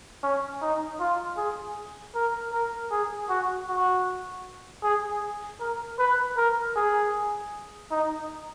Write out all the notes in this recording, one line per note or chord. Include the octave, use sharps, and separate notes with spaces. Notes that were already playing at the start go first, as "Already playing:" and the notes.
C#4
D#4
F4
G#4
A#4
A#4
G#4
F#4
F#4
G#4
A#4
B4
A#4
G#4
D#4